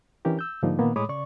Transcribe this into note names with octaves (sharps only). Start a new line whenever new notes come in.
E3 C#4 D4 G4 A#4
E6 G6
G#2 D3 F3 G3 A#3 D#4
A#2 D#3 A#3 B3
A2 G#3 C#5 B5 D6 D#6
C#3 D5 C#6